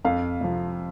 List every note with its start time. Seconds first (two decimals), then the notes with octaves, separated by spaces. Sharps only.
0.05 F2 F5
0.41 C3 F3